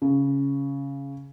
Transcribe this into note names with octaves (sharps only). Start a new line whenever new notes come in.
C#3